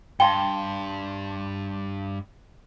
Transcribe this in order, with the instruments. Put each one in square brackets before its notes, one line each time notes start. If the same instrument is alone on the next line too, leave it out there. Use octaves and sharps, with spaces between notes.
[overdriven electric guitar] G2 [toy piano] F5 G5 [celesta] A5 C6 G7